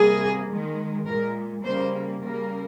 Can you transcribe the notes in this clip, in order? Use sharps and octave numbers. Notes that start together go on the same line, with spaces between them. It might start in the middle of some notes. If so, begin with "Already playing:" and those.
Already playing: C3 G3 A#3 G#4
D#3 G#3
A#2 G#3 A#4
C#3 G3 A#3 C5
C#3 G3 A#3 A#4